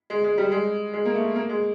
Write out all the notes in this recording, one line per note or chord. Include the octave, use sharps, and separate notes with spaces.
G#3
G#3
G3
G#3
G#3
A#3
A3
A#3
G#3